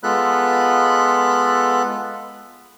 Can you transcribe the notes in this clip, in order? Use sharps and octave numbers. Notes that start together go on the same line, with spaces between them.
G#3 B3 F4 A4 B5 F#6